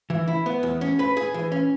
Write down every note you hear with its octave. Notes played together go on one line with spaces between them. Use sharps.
E3
E4
B3
E2
C#4
B4
G#4
E3
C#4